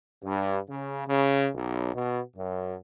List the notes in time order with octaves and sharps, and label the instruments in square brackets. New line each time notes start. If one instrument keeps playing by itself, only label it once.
[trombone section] G2
C#3
C#3
B1
B2
F#2